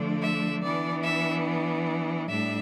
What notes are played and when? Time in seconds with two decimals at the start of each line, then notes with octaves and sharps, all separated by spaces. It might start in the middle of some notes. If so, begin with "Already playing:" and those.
Already playing: D3 F3 A3 D4
0.21 E5
0.63 E3 B3 D4 D5
1.04 E5
2.29 A2 G3 D4 E5